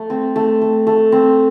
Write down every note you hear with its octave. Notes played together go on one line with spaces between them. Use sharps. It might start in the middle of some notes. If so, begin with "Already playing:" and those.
Already playing: A3
C4
A3
A3
A3
C4